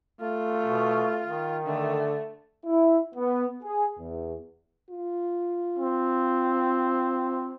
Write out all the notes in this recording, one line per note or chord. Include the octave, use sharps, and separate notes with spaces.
A3 F4
B2
D#3
D3 A3
E4
B3
G#4
E2
F4
C4